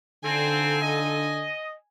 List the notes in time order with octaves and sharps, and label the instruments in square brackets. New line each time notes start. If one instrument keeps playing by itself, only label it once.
[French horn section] D3 [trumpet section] C4 [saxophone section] D#4 F4 A4 [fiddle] G#5
[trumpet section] D#5